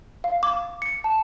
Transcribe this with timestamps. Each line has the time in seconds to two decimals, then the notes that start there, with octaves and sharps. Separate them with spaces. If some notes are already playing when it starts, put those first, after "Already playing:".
0.24 F5
0.43 D6
0.82 C#7
1.04 A5